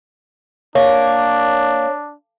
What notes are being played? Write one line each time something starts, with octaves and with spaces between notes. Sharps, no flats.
A#3 D4 C#5